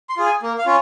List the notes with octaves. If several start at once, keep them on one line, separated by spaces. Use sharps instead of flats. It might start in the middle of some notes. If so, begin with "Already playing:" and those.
C6
F4 G#4
G#5
A#3
F5
C#4 F4